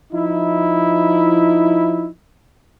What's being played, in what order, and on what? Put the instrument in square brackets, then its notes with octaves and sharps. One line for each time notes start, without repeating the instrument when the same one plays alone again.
[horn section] F3 D#4 E4